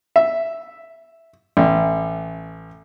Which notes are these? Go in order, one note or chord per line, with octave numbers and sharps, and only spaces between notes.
E5
A1